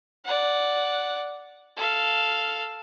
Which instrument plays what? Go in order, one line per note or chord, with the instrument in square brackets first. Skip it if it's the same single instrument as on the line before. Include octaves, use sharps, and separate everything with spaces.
[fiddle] D5 F#5
A4 F5